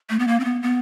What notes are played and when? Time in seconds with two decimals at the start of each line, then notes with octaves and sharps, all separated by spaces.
0.10 A3
0.19 B3
0.28 A#3
0.40 C4
0.45 B3
0.63 B3